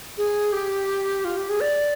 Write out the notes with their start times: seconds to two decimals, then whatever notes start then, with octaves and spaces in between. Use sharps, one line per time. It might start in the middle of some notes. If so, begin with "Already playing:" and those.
0.18 G#4
0.53 G4
1.25 F4
1.37 G4
1.49 G#4
1.61 D5